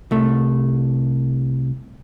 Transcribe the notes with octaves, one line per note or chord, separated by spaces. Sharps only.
C2 A3